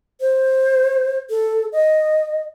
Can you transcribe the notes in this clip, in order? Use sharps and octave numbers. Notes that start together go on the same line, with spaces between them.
C5
A4
D#5